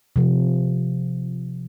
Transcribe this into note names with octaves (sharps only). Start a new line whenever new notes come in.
C3 F3